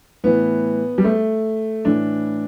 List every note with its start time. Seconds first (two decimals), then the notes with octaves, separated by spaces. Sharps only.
0.24 A2 E3 B3
0.98 G3
1.04 A3
1.85 A2 E3 D4